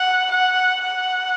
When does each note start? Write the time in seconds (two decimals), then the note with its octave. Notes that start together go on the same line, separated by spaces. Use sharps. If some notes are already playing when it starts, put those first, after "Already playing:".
Already playing: F#5
0.31 F#5
0.82 F#5